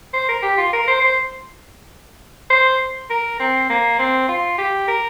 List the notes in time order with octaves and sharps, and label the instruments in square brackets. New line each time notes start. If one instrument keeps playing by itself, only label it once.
[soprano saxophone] C5
A#4
G4
F4
A#4
C5
C5
C5
A#4
C4
A#3
C4
F4
G4
A#4